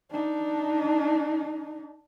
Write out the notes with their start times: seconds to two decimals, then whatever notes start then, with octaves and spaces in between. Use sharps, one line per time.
0.11 D4 D#4